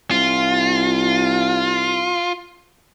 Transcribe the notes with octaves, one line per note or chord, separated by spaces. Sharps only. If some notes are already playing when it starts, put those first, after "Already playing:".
C2 F4